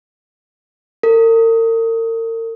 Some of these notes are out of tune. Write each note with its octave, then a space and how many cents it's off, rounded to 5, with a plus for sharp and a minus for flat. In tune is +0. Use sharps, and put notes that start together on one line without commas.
A#4 -40